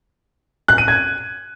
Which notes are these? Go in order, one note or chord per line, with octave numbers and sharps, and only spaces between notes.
F#6
D#7
G#6